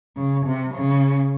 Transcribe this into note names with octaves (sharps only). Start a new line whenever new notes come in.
C#3
C3
C#3